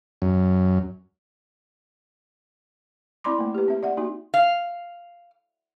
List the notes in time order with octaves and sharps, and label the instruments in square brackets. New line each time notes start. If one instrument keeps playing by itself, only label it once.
[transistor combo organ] F#2
[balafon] C4 E4 D5 B5 C6 D6
A3 A#3
G4 B4
C4 E5
D5 E5 F#5
A#3 D#4 F#4
[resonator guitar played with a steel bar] F5